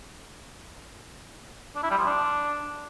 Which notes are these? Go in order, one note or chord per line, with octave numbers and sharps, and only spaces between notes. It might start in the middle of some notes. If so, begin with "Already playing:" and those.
D4
E4
G3
F3
D4